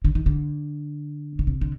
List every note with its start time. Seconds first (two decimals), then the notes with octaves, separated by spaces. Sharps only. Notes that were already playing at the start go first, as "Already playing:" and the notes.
0.04 D3
0.15 D#3
0.26 D3
1.39 C#3
1.47 C3
1.61 D3